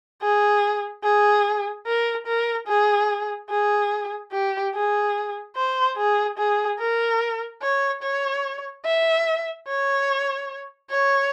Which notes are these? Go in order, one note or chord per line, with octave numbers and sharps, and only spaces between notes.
G#4
G#4
A#4
A#4
G#4
G#4
G4
G#4
C5
G#4
G#4
A#4
C#5
C#5
E5
C#5
C#5